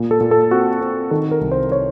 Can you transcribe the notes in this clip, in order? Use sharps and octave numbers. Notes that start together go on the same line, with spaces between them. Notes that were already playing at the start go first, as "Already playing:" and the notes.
Already playing: A#2
A4
A#2
A4
C4 F#4
C4
D#3 A4
A#4
C2
C5
C#5